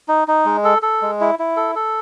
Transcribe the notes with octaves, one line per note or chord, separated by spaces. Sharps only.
D#4
D#4
G#3
A4
A4
G#3
E4
E4
A4
A4